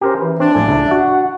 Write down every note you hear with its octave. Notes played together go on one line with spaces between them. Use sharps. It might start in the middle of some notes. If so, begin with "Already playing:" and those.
C#4 G4 A#4 C5
E3 B4
C4 D4
A#1 A2 F#3 G#5
C#2 E5
F#4 F#5